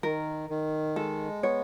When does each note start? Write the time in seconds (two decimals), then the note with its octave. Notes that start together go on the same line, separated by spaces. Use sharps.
0.03 D#3 A#4
0.50 D#3
0.96 G#3 A4
1.43 B3 C#5